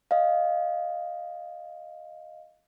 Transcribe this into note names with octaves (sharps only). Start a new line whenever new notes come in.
D#5 F5